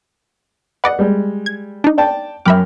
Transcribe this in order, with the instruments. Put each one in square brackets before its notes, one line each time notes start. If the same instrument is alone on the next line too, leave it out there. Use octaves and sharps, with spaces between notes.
[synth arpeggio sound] B4 D5 D#5 [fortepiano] F#5
[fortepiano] G3 G#3
[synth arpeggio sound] G#6
D4 D#4
[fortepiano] D5 G5 A5
[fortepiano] F#2 G5 F6 [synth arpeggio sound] E5 B5 D6